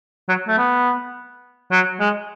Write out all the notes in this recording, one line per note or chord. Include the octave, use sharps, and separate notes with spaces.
F#3
A3
B3
F#3
G#3